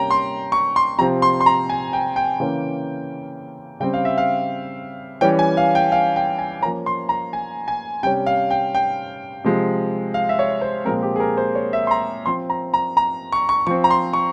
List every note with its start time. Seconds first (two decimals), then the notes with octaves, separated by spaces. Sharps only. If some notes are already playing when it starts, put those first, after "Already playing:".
Already playing: C3 G3 A#3 C#4 G5 A#5
0.11 C6
0.52 C#6
0.76 C6
0.99 C3 F3 C4 A#5
1.22 C6
1.41 C6
1.46 A#5
1.70 G#5
1.93 G5
2.16 G5
2.40 C#3 E3 A#3 C#4
3.80 C#3 G3 C4 G5
3.94 F5
4.05 E5
4.18 F5
5.21 E3 G3 C#4 G5
5.39 G#5
5.57 F5
5.75 G5
5.92 F5
6.16 G5
6.39 G#5
6.62 F3 A#3 C#4 A#5
6.86 C6
7.09 A#5
7.33 G#5
7.68 G#5
8.03 C3 G3 C#4 G5
8.26 F5
8.50 G5
8.75 G5
9.44 C3 F3 G#3
10.14 F5
10.29 E5
10.39 C#5
10.61 C5
10.85 A#2 F3 G#3 C4 A#4
11.03 G4
11.16 G#4
11.20 A#4
11.38 C5
11.55 C#5
11.73 E5
11.87 C6
11.91 A#5
12.26 F3 C4 C6
12.50 A#5
12.74 A#5
12.97 A#5
13.32 C#6
13.49 C#6
13.67 F3 C4 C#6
13.84 A#5
13.90 C6
14.13 C#6